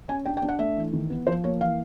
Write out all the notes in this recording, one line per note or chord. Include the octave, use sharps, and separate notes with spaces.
C#4 G#5
D4 G5
G5
D4
F#5
A3 E5
E3
D#3
B3
F3 C5
A#3 C#5
E3 F5